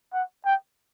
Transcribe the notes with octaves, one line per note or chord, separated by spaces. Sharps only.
F#5
G5